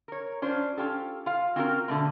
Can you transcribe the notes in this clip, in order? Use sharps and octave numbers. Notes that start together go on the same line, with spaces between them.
A#4 C#5
C#4 D4 F4 C5
C#4 F4 G4 A4
F4 F5
C4 C#4 F4 F#4 A4 A#4
B2 D3 A3 C4